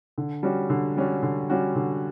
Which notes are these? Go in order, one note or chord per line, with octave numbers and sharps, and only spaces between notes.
D3
G3 C#4 F#4
D3
G3 C#4 F#4
D3
G3 C#4 F#4
D3